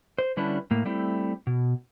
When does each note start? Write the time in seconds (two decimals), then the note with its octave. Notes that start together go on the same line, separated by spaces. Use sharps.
0.19 C5
0.37 D3 G3 C#4 D4 E4 B4
0.71 A2 A#3
0.85 G3 A3 C4 E4
1.47 B2